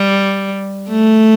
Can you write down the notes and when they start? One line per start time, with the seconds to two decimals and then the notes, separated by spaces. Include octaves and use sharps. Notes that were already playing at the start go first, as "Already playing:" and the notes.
Already playing: G3
0.90 A3